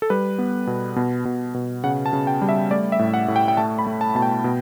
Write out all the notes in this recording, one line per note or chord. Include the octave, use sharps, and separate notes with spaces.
A4
G3 B4
B3
B2
B2
B2
B2
C#3 F#5
A5
C#3
G5
G3
E5
A3 D5
E5
A2
F#5
A2
G5
G5
A3 A5
B5
A3
A5
B2 A5
G5
B2